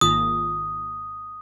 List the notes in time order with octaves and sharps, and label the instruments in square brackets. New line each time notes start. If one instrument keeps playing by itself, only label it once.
[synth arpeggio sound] G#1 G#2 D#3 A#3 F4 [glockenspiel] D#6